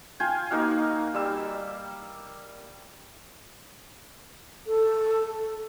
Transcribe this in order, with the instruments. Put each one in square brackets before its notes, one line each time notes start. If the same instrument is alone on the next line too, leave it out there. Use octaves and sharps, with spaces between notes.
[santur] F4 F5 G5 G#5
A#3 D#4 F#4 F5
G3 E6
[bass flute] A4